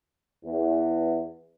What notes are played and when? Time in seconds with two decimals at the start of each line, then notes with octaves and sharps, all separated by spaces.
0.44 E2